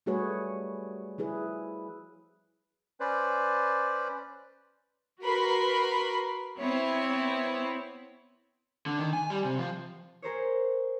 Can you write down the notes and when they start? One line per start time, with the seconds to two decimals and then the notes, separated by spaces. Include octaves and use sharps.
0.06 G3 A3 F#4 G#4 B4 C#5
1.18 F3 E4 G#4 B4
3.00 C#4 B4 C5 D5
5.21 F#4 A#4 B4 B5 C6
6.58 B3 C4 E4 C#5
8.86 D3
8.99 D#3
9.13 G#5
9.30 G3
9.44 C3
9.58 F3
10.22 G#4 A#4 C5 C#5